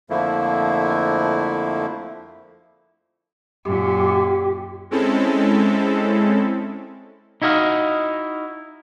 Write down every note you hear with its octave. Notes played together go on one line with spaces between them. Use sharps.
F2 D3 F3 A3 A#3 E4
F#2 A#2 G4
G#3 C4 C#4 E4 A4
D#4 E4 F#4 D#5 F5